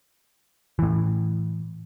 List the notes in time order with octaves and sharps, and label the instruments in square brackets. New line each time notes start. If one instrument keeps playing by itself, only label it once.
[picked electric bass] A2 E3